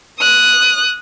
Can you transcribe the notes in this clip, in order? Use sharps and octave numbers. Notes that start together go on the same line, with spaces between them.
D#6 F#6